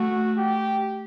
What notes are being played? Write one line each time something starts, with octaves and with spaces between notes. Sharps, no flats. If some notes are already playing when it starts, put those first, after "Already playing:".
Already playing: A3 F#4
G4